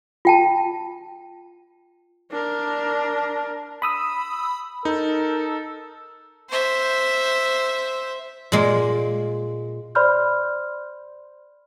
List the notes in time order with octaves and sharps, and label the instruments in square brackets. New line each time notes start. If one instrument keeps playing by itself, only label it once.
[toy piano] F4 G5 A5
[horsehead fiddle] D4 A#4
[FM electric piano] B5 D#6 E6
[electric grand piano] D#4 [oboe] A4 [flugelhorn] A#4
[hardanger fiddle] C5 E5
[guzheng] A#2 G#3 A#3
[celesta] C5 D5 B5 C6 F6 G6